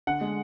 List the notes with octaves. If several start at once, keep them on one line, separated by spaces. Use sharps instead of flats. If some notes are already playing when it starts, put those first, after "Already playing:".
D3 F#5
G#3